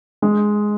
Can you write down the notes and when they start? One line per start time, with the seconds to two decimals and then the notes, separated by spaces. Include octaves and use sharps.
0.22 G#3